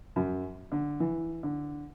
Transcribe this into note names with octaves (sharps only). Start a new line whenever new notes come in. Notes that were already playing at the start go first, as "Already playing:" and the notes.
F#2
D3
E3
D3